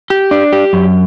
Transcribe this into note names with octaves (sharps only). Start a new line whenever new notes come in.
G4
D4
G4
F#2